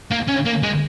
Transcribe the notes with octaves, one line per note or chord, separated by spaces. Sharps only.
A#3
C#4
A#3
G#3